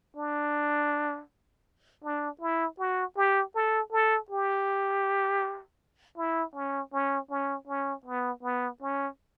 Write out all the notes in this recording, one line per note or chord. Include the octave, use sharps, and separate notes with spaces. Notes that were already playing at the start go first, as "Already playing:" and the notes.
D4
D4
E4
F#4
G4
A4
A4
G4
E4
C#4
C#4
C#4
C#4
B3
B3
C#4